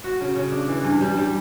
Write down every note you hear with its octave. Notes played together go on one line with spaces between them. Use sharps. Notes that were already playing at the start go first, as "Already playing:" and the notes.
F#4
C#3
C#3
D4
E3
G2
G3
G3